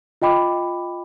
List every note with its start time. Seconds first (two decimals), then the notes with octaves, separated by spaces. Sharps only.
0.22 F4 D#5 G5 B5 D6